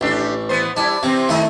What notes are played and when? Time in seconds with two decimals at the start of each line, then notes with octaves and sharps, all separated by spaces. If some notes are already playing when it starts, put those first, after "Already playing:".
0.01 A1 A3 D4 G4
0.49 E3 B3 C5
0.77 G3 D4 E4
1.03 C3 E3 C4
1.29 D#3 A3 E4 D#5 D#6